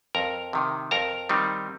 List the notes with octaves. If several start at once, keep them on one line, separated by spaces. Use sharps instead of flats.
F2 A#4 A#5
C3 D#3
F2 A#4 A#5
D#3 G3 C4 D#4